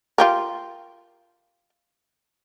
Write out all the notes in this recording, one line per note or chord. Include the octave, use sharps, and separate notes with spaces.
F4 G4 A#4